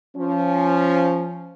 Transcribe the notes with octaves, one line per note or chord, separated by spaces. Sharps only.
F3 C#4